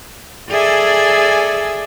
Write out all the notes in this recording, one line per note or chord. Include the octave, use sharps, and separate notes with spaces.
G#4 A4 D5 E5 G#5